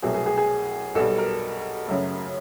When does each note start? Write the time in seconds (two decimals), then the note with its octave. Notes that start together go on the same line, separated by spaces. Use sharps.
0.02 C2 B2 F#3 A3 G#4
0.14 G#4
0.26 G#4
0.38 G#4
0.95 B1 B2 G3 A4
1.18 A#4
1.87 F#2 C#3 F#3 A3